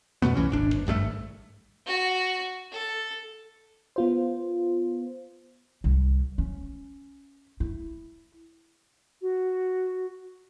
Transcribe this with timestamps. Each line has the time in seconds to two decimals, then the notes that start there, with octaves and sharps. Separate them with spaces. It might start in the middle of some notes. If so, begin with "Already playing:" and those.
0.22 F2 B2 A3 B3
0.35 C2 E3 C#4
0.50 D#1 G#1 D4
0.73 G1
0.87 A#1 G2 F3 A3
0.99 G#1
1.86 F#4
2.72 A4
3.96 B3 F4 C5
5.84 C2
6.38 C#4
7.60 E4
9.22 F#4